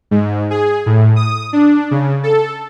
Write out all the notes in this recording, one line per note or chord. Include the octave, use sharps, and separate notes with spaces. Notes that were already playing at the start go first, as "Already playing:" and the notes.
G#2
G#4
A2
D#6
D4
C#3
A4